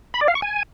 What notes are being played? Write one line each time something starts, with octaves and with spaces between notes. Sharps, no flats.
B5
D5
F5
C#6
G#5